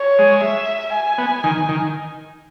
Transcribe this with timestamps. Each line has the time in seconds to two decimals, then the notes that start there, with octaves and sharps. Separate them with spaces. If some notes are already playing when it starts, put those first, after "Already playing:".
Already playing: C#5
0.19 G#3
0.43 E5
0.93 G#5
1.18 B3
1.44 D#3
1.69 D#3